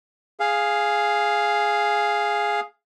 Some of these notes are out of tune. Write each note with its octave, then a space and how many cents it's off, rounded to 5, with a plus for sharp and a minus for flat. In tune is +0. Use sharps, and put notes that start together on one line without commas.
G#4 +0 F5 +0